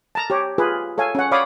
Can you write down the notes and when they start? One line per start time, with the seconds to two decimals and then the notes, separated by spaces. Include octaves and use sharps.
0.15 A5 A#5
0.30 G4 C#5
0.58 F4 G#4 B4
0.98 A4 C#5 F5 G#5
1.15 C#4 F#5
1.31 C#5 D5 F5 B5 D6 D#6